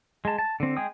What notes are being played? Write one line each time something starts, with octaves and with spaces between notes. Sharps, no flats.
G#3 A5
A5
D3 C4
G#3 G#4 G5 D#6